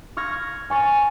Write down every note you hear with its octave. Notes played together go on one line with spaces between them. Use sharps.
C#6 F6 G#6 A#6
G#5 C#6 A6